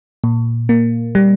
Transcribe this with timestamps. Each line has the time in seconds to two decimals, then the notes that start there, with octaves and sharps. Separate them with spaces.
0.24 A#2
0.69 A#3
1.15 G3